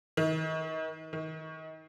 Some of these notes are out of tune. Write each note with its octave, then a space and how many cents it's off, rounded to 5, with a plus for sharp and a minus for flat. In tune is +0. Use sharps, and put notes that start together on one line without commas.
D#3 +35
D#3 +30